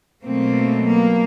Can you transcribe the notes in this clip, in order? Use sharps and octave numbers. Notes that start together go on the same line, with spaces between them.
B2 F#3 A3 A#3 C4
A#3